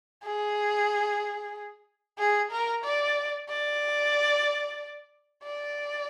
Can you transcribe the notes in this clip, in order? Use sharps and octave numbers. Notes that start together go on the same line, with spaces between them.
G#4
G#4
A#4
D5
D5
D5